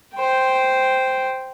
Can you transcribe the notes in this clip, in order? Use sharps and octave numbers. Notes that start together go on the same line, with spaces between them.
C5 G5